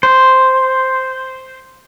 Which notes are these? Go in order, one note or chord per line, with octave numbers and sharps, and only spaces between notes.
C5